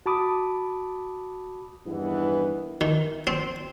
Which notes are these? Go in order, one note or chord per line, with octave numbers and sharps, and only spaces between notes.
F#4 A5 B5 D6 D#6
E2 G2 D#3 E3 B3
D#3
C4